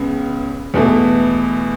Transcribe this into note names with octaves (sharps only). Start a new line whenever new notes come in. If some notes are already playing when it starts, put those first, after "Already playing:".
Already playing: C#2 C#3 G#3 B3
E2 B2 A3